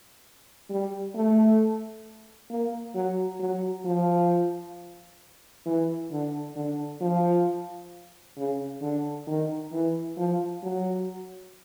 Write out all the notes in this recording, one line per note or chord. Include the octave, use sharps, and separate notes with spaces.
G3
A3
A#3
F#3
F#3
F3
E3
D3
D3
F3
C#3
D3
D#3
E3
F3
F#3